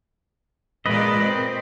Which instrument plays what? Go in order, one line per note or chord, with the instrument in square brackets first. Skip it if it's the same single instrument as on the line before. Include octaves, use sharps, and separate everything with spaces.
[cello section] A#2 G#3 D5 [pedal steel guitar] B4 D#5
[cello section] C4